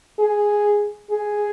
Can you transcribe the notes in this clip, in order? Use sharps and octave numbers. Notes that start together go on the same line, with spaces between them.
G#4
G#4